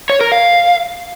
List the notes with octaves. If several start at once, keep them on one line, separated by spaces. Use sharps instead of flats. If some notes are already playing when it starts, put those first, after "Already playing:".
C#5
A#4
F5